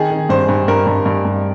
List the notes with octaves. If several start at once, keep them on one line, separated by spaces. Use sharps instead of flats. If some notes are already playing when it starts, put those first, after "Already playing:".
Already playing: D#3 G#4
D#3
G2 C5
G2
G2 A#4
G2
G2
G2